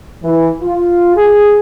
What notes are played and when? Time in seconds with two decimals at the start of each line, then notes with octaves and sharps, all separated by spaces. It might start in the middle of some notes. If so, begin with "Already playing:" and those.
0.23 E3
0.62 F4
1.15 G#4